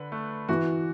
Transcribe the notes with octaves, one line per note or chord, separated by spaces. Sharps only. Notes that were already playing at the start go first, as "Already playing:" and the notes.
Already playing: D3 B4
A3
E3 F#4